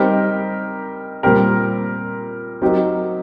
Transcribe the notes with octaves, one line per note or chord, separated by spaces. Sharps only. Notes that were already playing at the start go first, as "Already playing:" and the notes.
Already playing: G3 C4 D#4 G4 A#4
A#2 G3 C4 G4 A#4
F#3 C4 D#4 G4 A#4